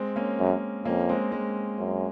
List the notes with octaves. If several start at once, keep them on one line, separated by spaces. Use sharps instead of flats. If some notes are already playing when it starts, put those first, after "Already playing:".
Already playing: G#3 C4
A#3 C#4
F#2
F2 A#3 C#4
G#3 C4
G#3 C4
F#2